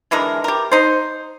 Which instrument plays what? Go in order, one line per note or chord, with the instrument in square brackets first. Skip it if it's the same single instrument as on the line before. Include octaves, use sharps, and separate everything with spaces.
[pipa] D3 E3 G#3 A#4
G4 A#4
D#4 C5